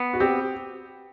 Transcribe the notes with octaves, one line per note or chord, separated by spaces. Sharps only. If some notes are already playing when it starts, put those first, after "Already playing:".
Already playing: B3
F#4
C4 G4